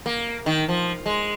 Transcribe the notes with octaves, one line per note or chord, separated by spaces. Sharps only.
A#3
D#3
F3
G#3